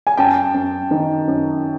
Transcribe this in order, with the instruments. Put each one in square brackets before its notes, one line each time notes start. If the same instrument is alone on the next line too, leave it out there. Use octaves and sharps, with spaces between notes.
[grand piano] G#5
F#2 G5 A5
F#2
D#3
F#2